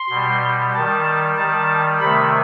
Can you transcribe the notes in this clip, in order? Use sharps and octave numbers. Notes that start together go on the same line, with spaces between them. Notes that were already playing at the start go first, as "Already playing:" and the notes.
Already playing: C6
B2 G3
D#3 G3 A5
D#3 G3 A5
C3 D#3 A3 B5